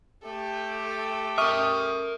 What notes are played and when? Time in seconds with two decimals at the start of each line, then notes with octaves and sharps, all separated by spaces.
0.24 A3 G4 A4
1.38 A#4 E5 C#6 D#6 F6